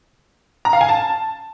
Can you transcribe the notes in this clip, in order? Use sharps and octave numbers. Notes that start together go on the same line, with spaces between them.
A#5
F5
G#5
A5